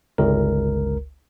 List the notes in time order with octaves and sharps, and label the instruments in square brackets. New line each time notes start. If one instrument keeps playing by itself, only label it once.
[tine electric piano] G1 C#2 A#4